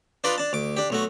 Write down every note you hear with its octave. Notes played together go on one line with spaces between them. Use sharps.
D4 D#4 F4 B4 D5 D#5
D4 A5
D2 D6
D4 G4
B1 A3 F#4